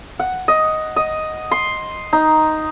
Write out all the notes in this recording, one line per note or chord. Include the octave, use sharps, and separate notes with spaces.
F#5
D#5
D#5
C6
D#4